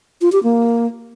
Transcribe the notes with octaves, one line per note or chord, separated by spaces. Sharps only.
F4
G4
A#3